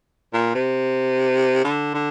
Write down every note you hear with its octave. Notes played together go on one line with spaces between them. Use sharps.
A#2
C3
D3
D3